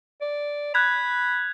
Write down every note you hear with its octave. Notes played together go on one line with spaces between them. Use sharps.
D5
B5 F#6 G#6 F7